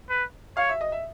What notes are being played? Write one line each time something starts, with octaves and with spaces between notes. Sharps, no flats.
B4
C#5 F5
E5
D#5
E5